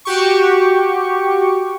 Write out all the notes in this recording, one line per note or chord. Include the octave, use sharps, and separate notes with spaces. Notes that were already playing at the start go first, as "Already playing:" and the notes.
F#4 G4 C#6